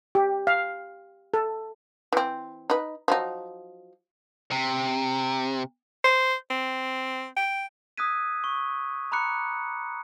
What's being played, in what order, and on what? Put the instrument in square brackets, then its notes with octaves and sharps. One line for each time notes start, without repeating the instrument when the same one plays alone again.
[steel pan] G4
F5
A4
[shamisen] E3 C4
D#4 B4
F3 F#3 D#4
[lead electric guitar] C3
[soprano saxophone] C5
C4
G5
[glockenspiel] D#6 E6 F#6 G#6 B6 D#7
C#6
A#5 B5 D6 F#6 C#7